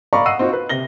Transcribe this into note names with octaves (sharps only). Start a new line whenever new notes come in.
D5 D#5 F5 A#5 B5 C#6
D#5 F#5 E6 C7 D#7
C4 D#4 F4 F#4
B4
C3 A#6 G7